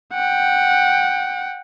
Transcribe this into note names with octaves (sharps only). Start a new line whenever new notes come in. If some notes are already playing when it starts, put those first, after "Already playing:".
F#5 G5